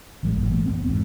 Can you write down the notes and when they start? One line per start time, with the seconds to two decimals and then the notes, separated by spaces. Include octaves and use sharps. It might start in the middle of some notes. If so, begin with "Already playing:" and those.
0.23 A1 E3 G3 G#3
0.34 G#1 F#2 A#2
0.50 E3 G#3 A3
0.66 F#1 G#2 B3 C4
0.88 E2 G#2